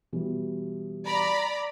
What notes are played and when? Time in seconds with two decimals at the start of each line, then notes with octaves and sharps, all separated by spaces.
0.13 B2 E3 G3
1.06 D5 A#5 B5